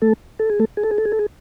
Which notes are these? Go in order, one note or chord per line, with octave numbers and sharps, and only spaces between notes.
A3 A4
A4
G#4
A3 A4
G#4
A4
G#4
A4
G#4
A4
G#4